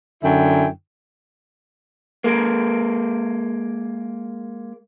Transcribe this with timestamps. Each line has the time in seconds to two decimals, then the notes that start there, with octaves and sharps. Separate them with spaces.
0.23 F#2 D3 E4 G5 G#5
2.24 G#3 A#3